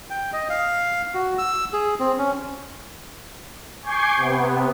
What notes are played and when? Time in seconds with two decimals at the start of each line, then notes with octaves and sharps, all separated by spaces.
0.10 G5
0.33 D#5
0.50 F5
1.14 F#4
1.38 E6
1.73 G#4
2.00 C4
2.18 C#4
3.83 G#5 C#6 D6 G6 G#6 C7
4.17 C3 B3